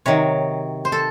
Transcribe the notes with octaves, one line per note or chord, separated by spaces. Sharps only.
C3 D#3 F#3 C#5
C5
A4